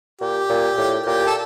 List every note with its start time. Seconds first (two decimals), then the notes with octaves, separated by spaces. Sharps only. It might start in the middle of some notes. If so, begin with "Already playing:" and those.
0.21 A#2 G4
0.50 A#2
0.78 A2
1.06 A#2 G4
1.26 A4